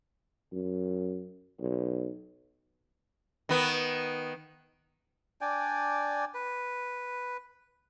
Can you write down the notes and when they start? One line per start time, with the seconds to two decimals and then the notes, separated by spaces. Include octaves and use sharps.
0.53 F#2
1.60 B1
3.49 D#3 B3
5.41 D4 D5 G5 G#5
6.34 B4